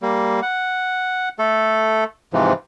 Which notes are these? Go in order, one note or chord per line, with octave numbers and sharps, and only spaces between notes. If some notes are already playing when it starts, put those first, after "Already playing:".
G3 A#3
F#5
A3 A4
G#2 C3 E3 F3